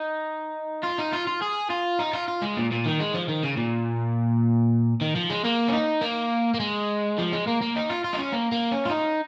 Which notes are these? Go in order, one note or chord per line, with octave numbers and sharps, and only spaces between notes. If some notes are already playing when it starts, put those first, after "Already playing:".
Already playing: D#4
F4
D#4
F4
F4
G#4
F4
D#4
F4
F4
G#3
A#2
A#2
D#3
G#3
F3
D#3
C#3
A#2
D#3
F3
G#3
A#3
C#4
D#4
A#3
A#3
G#3
F3
G#3
A#3
A#3
D#4
F4
F4
D#4
C#4
A#3
A#3
C#4
F4
D#4